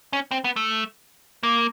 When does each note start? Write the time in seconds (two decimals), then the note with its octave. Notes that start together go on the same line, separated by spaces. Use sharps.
0.13 C#4
0.31 C4
0.44 B3
0.56 A3
1.43 A#3